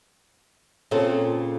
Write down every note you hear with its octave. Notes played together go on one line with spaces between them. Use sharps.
A#2 C#3 C4 F4 A4